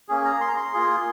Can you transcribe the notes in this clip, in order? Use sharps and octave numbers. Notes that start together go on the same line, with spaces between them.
A#3 C#4 G#4
A#5
C6
A#5
C6
A#3 F4 G#4